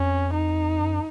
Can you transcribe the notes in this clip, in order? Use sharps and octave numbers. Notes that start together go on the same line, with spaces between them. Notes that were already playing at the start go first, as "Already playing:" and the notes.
Already playing: F2 C#4
D#4
F#2